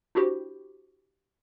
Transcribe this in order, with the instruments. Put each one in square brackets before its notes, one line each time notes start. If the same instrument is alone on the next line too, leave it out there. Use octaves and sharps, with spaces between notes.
[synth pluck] D4 E4 F#4 G4 C5